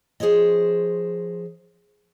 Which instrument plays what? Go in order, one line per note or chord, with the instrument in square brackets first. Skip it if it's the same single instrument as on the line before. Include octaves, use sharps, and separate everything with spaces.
[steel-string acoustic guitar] F3 G#4 C5 C#5 D#5